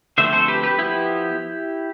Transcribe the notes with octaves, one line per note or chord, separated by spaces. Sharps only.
D3 F3 A3 C4 C5 E5
A4 C5
G4 B4
G4 B4
F3 B3 E4 G4